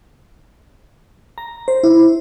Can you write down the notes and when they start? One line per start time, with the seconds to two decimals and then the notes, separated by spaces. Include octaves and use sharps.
1.38 A#5
1.68 C5
1.83 E4